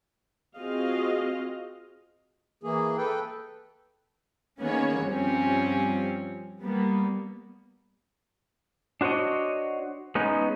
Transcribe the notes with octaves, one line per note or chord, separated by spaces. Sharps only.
C4 F4 F#4 G#4 D#5 F5
E3 A#3 G#4
A4 B4 G5
D#3 A#3 B3 C#4 G#4 C#5
G2 F3 G3 C4 C#4
G3 A#3 B3
D4 F#4 C5 C#5 D#5
G#3 B3 C#4 D#4